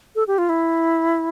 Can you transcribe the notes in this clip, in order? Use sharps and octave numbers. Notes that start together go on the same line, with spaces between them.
A4
G4
F4
E4